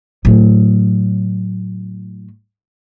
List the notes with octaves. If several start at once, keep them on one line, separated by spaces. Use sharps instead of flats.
A2 F#3